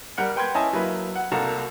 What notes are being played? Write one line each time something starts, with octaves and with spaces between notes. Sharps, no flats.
G3 A#4 F#5 F#6 C#7
B4 G5 C6 G6 G#6
C#4 E4 D#5 G#5 A5
F#3 A#3 E4 B4
F#5
C2 A#3 F#4 A4 A5 A#5